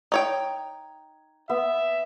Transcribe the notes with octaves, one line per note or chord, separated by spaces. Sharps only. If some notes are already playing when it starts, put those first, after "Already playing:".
D#4 C#5 G5
B3 E5